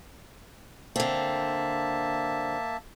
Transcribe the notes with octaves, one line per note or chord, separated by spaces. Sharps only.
D3 A#3 C4 E5 A5